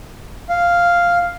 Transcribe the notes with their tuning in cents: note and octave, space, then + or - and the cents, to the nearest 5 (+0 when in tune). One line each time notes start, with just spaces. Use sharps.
F5 -5